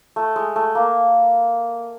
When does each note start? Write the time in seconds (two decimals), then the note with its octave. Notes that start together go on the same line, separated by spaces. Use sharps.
0.16 A3
0.36 G#3
0.56 A3
0.75 A#3